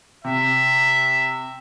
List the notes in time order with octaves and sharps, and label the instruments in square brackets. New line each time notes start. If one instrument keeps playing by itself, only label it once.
[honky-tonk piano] C3 [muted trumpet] E5